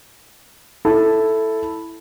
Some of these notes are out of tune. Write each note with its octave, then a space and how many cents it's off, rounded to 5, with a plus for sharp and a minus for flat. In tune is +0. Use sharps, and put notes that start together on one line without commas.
E4 +0 A4 +0